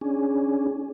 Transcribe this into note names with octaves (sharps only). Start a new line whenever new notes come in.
C#4 D4 G#4